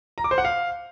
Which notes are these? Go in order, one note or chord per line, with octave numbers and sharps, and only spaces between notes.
A#5
D6
C5
F#5
F5